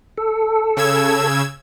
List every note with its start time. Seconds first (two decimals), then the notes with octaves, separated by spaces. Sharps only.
0.18 A4
0.77 C#3 E6 G#6